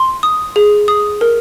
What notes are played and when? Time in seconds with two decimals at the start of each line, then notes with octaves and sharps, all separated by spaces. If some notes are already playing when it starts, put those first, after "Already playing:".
Already playing: C6
0.23 D#6
0.56 G#4
0.88 D#6
1.21 A#4